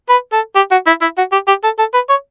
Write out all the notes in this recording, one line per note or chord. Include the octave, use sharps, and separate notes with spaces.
B4
A4
G4
F#4
E4
E4
F#4
G4
G4
A4
A4
B4
C#5